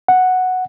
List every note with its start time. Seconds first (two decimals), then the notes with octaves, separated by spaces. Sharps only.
0.08 F#5